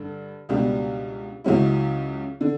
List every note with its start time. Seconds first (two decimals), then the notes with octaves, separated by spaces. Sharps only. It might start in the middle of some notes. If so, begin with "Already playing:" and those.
Already playing: G2 D3 D4
0.49 C#2 B2 G3 D4
1.44 C#2 C#3 F#3 C#4 E4
2.41 D3